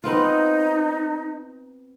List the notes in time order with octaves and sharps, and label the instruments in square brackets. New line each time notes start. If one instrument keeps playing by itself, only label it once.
[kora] B3 C4 F4 [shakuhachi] D#4